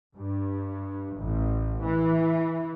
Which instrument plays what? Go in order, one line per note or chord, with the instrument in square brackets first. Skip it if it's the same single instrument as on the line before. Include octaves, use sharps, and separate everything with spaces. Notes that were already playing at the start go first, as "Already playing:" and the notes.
[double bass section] G2
A1
E3